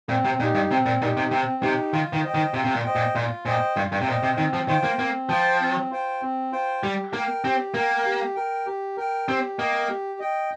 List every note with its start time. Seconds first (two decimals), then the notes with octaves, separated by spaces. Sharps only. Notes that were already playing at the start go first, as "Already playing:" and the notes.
0.09 A#2 C4
0.25 C3
0.40 A#2 D#4 G4
0.55 G2
0.71 C3 C4
0.86 A#2
1.01 A#2 D#4
1.05 G4
1.17 C3
1.31 C3 C4
1.62 C3 D#4 G4
1.93 D#3 F4
2.13 D#3
2.23 C5 D#5 G5
2.34 D#3
2.54 C3 F4
2.64 C3
2.74 A#2
2.84 C5 D#5 G5
2.95 A#2
3.15 A#2 F4
3.46 A#2 C5 D#5 G5
3.76 G2 F4
3.92 G2
4.01 C3
4.08 A#2 C5 D#5 G5
4.23 C3
4.38 D#3 C4
4.53 F3
4.68 D#3 F4 C5 G5
4.84 A#3
4.99 A#3 C4
5.29 F3 F4 C5 G5
5.60 C4
5.91 F4 C5 G5
6.22 C4
6.52 F4 C5 G5
6.83 G3 G4
7.13 A#3 A#4 G5
7.44 C4 G4
7.74 A#3 A#4 G5
8.05 G4
8.36 A#4 G5
8.66 G4
8.97 A#4 G5
9.28 C4 G4
9.58 A#3 D#5 G5
9.89 G4
10.19 D#5 G5